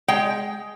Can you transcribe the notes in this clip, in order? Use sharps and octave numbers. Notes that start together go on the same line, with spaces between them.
G#3 G5